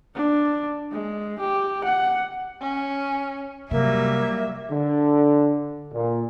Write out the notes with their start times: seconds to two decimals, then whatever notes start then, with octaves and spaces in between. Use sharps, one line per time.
0.15 D4
0.92 G#3
1.40 G4
1.84 F#5
2.61 C#4
3.71 C3 F#3 G3 A#3 E5
4.70 D3
5.93 A#2